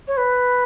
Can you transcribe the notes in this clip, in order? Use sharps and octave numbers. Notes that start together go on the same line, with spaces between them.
C#5
B4